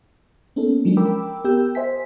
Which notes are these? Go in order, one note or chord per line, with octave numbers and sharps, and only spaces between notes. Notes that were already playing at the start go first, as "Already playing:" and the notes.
A#3 B3 C#4 D#4 A4
F3 F#3 G#3 C#4 D4
A#4 G5 B5 D6 E6
B3 G4 A#4 G5 E6 G6
C5 D#5 E5 G#5 B6